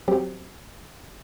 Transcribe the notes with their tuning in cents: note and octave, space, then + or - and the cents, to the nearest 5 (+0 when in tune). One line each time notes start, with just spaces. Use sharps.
F#3 +0 C4 +0 G4 +0